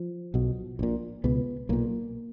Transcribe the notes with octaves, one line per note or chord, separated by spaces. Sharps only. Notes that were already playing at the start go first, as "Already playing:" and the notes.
Already playing: F3
B1 B2
A#1 A#2
C#2 B2 B3
B1 A#2 A#3